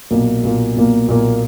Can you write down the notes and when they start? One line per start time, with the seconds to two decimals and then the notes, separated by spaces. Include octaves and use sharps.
0.11 B1 A#2 A#3
0.43 B1 A#2 A#3
0.76 B1 A#2 A#3
1.08 B1 A#2 A#3